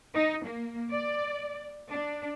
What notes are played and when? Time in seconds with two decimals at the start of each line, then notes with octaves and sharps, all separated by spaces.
0.14 D#4
0.45 A#3
0.91 D5
1.90 D4